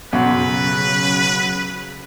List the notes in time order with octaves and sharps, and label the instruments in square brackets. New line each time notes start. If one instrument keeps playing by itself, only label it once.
[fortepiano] B1 F#2 [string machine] C#3 F#3 [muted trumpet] B4